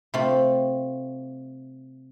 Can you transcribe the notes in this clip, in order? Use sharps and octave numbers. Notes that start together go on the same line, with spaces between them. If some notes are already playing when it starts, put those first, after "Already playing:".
C3 A3 C4 F4